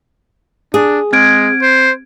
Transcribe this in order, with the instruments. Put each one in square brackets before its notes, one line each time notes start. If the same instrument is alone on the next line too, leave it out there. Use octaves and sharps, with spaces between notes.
[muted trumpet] D4 [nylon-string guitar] G#4
[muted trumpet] G#3 [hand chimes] C4 G#6 D7
[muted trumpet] C5